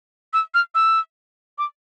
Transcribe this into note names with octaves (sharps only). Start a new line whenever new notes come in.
E6
F6
E6
D6